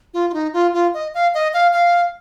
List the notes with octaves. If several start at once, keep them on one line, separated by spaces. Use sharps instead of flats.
F4
F4
D#4
F4
F4
D#5
F5
D#5
F5
F5